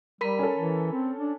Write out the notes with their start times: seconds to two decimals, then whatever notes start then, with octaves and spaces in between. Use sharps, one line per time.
0.21 G3 A#4 B5 B6
0.39 C#4 A4
0.58 E3
0.93 C4
1.19 D4